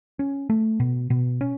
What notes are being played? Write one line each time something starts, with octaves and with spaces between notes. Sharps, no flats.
C#4
A3
B2
B2
C#4